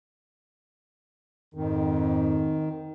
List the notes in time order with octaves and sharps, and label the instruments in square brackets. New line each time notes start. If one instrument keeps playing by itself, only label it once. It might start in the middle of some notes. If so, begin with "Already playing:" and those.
[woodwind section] F2 G#2 [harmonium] D#3